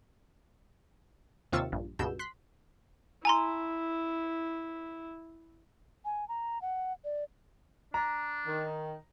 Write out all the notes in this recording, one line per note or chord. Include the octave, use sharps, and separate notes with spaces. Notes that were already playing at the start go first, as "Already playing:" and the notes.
D#2 C3 F4 C#6 E6 A6
A#1 G2
C#2 G2 B2 E6 G6 E7
C6 F#6 B6
E4 G#5 A#5 C6
G#5
A#5
F#5
D5
D4 A#5
D#3